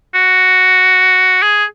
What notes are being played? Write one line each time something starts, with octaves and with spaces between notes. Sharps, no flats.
F#4
G#4